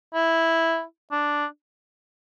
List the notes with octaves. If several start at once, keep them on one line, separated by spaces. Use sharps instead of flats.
E4
D4